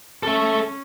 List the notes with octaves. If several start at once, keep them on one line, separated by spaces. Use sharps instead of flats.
C#4 A4 E5